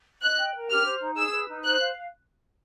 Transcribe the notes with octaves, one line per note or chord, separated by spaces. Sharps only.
D#5 F#6
G5
A#4
G4 F6
C5
D#4
G#4 E6
B4
D#4
C5 F#6
F5